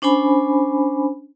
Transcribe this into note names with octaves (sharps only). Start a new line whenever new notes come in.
C#4 D4 C5 G#5 B5